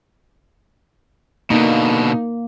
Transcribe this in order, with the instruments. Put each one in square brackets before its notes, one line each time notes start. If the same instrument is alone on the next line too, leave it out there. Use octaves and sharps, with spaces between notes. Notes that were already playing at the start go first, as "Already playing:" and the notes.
[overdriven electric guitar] B2 D3 [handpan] A#3 [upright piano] D#4